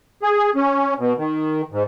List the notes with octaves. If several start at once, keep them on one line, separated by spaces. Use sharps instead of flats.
G#4
C#4
B2
D#3
G#2